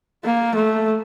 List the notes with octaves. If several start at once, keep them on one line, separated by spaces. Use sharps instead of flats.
A#3
A3